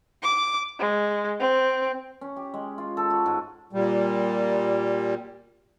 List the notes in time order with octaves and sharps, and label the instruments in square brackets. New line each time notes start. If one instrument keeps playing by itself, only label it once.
[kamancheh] D6
G#3
C4
[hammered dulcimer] C#4
G4
G#3
F4
A4
F#4
G#2
[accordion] A#2 G3